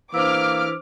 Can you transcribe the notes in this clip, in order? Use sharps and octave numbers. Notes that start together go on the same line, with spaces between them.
E3 A#3 D4 C5 D6 E6 F6